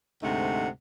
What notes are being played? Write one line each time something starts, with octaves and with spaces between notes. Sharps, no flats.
D2 G#2 C3 A3 D#4 F#5